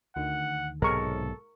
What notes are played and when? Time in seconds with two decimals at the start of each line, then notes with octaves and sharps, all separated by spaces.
0.16 D2 D#3 F#5
0.82 B1 G#2 C3 G#3 A4 A#4 C#5 C#6